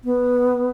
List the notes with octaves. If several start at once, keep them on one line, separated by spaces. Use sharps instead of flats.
B3